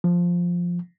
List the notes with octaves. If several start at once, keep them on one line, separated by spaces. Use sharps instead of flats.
F3